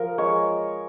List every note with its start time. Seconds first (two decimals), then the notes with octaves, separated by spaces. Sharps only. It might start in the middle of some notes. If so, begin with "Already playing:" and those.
Already playing: F3 A#4
0.18 G#3 C#5